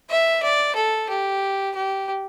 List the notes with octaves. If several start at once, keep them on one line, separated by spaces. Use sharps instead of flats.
E5
D5
A4
G4
G4